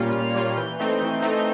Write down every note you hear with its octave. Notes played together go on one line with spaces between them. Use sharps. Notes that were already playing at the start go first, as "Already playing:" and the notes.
Already playing: A#2 G3 A#3 C#4 F4
A#2 F6
G3 A#3 C#4 F4
E3 G6
A3 C4 D#4
E3
A3 C4 D#4